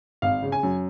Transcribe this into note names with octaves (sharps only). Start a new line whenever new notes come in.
G#1 F5
C#3
G#5
F#2